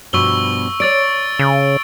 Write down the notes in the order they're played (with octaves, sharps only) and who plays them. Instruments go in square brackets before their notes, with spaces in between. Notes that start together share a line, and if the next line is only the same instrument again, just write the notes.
[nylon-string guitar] G2 B2 F3 [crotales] C#6 E6 G7
[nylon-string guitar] C#5 D5 [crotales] E6 A6 D7
[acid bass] C#3